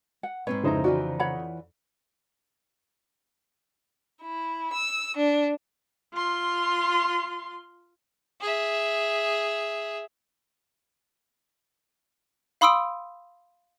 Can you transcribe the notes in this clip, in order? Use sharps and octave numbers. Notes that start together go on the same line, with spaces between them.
F#5
G#2 C4 B4 C#5
F2 C#3 D#4 E4 C5 A#5
E3 F4 F#4 D5
C#5 F#5 B5
E4
E6
D4
F4 C6
G#4 E5
F5 B5 C6 D#6 E6 D7